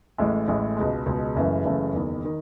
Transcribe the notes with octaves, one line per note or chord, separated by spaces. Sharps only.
A1 A2 G#3
A1 A2 G#3
C#2 B2 G#3
C#2 B2 G#3
F#1 F#2 C#3 E3 A3
F#1 F#2 C#3 E3 A3
F#1 E2 D#3
D#3